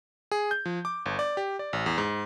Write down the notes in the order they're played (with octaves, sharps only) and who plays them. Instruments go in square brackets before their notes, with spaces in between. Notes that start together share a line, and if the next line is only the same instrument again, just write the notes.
[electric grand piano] G#4
G6
F3
D6
G1
D5
G4
D5
A1
E2
G#2